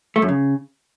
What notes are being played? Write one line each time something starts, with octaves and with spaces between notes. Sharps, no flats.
A3
F#2
C#3